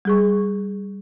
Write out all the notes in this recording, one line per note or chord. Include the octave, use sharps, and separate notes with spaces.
G3 G#4 C#6